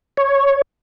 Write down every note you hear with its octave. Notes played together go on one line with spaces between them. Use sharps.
C#5